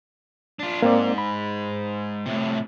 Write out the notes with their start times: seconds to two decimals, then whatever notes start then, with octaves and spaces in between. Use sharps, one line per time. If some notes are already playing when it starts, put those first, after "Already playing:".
0.59 D4 F4
0.82 G#2 A#3 C4 D5
1.18 B5
2.26 A2 C3